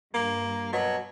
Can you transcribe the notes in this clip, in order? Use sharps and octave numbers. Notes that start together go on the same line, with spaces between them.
G2 A#3
B2 F#3